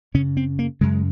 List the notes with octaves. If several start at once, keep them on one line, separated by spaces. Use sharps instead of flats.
F#2 C#3 C#4
C4
A#3
F#2 C#3 G#3